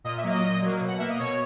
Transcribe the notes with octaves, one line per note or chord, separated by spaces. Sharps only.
A#2 D#5
E5
F#3 A#3
D#5
A#2
F#3 A#3
B2
F#5
A#3 E5
D#5
B2 C#5